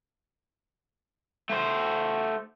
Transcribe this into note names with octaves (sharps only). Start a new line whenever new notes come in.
A3 C5